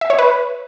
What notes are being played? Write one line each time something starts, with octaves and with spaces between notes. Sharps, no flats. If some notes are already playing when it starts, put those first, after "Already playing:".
E5
C#5
B4